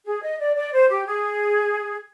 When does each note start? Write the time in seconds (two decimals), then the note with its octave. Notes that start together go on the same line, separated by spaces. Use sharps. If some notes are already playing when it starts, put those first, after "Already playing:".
0.06 G#4
0.23 D#5
0.39 D5
0.56 D5
0.73 C5
0.89 G4
1.06 G#4